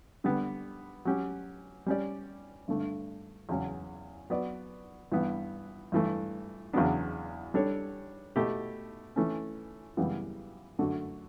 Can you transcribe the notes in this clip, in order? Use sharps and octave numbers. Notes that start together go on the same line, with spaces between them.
D3 G3 B3
F#3 C#4 G4
G3 C#4 G4 D5
G2 D3 A3 D4
E2 C#3 F#3 C#4
F#3 B3 F#4 B4 D5
G2 E3 B3
G2 E3 A3
E2 C#3 F#3 B3 D4
G3 D4 A4 C#5
B2 A3 E4 G4
E3 A3 C#4
F#2 C#3 E3 G3 B3
F#2 D3 A3 D4 F#4